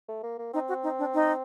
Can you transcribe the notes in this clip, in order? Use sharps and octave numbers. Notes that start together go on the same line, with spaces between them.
A3
A#3
A#3
C4 D#4
F#4
D#4
D4
D#4